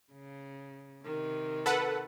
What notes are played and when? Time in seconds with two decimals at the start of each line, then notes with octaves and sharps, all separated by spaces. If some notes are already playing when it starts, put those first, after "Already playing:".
0.12 C#3
1.06 C3 D#3
1.66 A4 B4 F#5